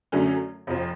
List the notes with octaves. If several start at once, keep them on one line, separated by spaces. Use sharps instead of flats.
F#2 D3 F#3 A3 C#4
F1 F2 F3